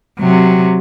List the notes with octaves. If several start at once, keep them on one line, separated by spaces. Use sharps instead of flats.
C3 F#3